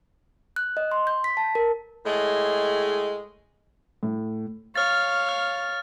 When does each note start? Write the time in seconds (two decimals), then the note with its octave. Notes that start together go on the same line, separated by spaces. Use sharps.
0.56 F#6
0.77 D#5
0.92 C6
1.07 G6
1.24 B6
1.37 A5
1.55 A#4
2.06 A2 G#3
4.03 A2
4.76 C#5 F5 F6 A6
5.29 F6